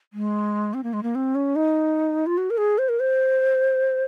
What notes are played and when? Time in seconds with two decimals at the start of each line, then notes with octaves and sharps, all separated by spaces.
0.13 G#3
0.74 C4
0.83 A#3
0.93 G#3
1.03 A#3
1.15 C4
1.35 C#4
1.56 D#4
2.26 F4
2.37 F#4
2.50 A#4
2.58 G#4
2.78 C5
2.89 A#4
3.00 C5